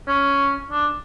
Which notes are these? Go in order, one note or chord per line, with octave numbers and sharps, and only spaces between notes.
C#4
D4